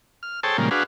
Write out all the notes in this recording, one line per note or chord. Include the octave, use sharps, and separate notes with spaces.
F6
G#4 A4 C5 C#5 G5 A5
A#2 C#3 F3 G3 G#3 A#3
D4 F#4 G#4 B4 F5